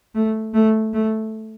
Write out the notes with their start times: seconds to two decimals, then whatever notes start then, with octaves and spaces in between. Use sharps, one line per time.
0.15 A3
0.54 A3
0.93 A3